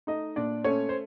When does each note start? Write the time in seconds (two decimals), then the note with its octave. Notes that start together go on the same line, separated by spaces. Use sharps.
0.07 A3 D#4 D#5
0.36 A#2 D4 D5
0.64 A3 C#4 C#5
0.89 C5